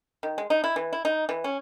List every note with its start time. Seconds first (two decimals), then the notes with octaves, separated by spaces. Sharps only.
0.23 D#3
0.38 G#3
0.50 D#4
0.64 E4
0.76 E3
0.93 E4
1.05 D#4
1.29 E3
1.44 C#4